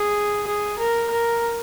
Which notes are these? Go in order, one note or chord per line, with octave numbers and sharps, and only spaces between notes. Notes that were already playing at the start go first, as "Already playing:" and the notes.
Already playing: G#4
G#4
A#4
A#4